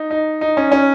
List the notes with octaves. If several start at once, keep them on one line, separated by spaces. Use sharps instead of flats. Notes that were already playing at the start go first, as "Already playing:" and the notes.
Already playing: D#4
D#4
D#4
C#4
C#4